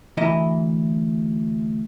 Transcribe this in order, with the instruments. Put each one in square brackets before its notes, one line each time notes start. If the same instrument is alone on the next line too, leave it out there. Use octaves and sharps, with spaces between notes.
[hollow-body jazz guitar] D2 E3 E4 D#5 A#5